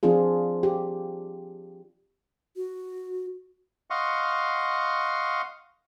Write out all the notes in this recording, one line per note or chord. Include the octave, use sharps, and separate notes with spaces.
F3 C4 D4 F4 G#4
G4
F#4
D#5 F5 F#5 C6 C#6